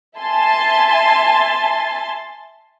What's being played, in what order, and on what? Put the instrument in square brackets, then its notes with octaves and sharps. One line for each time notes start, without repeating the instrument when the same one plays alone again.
[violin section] E5 G#5 A5 C6 A6